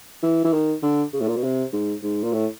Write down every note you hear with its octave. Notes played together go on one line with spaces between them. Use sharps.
E3
E3
D#3
D3
C#3
A2
A#2
B2
C3
G#2
G#2
A#2
A2